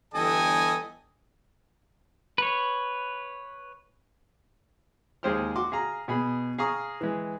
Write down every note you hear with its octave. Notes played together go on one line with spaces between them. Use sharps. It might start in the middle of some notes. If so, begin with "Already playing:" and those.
G1 E3 A4 D#5 G5 G#5
B4 C#5
D#2 G#3 G#4 C5 G5 F6
F#4 C6 D6
G#4 F5 A#5
B2 G#4 B5
G#4 F5 A#5 C#6 D#6
E3 G#3